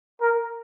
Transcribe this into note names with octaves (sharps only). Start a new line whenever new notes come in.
A#4